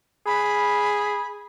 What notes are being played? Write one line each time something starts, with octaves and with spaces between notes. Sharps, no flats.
G#4 B5